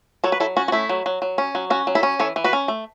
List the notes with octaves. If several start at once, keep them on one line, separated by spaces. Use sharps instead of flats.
F#3 A4 C#5
B4
F#3 E4 A4
C#4 F#4
F#4
A3 E4
F#3
F#3
F#3
C#4
F#3
C#4 F#4
F#3
E4 A4
C#4
E3 A4 C#5
E3
F#4 B4
C#4
A3